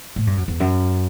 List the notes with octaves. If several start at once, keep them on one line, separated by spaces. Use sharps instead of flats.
A2
G2
F#2
E2
F#2